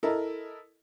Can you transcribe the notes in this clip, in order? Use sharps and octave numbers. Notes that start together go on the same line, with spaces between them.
E4 A4 A#4 D#5